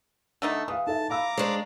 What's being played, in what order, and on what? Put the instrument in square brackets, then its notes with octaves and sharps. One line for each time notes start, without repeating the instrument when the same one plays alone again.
[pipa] D3 A3 D#4
[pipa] E3 [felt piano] F5 D#6
[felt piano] D#4 A4 E5 [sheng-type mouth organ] A5
[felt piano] F5 B5 E6 [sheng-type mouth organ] A#5 D6
[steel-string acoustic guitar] G#3 D4 [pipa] C5 C#5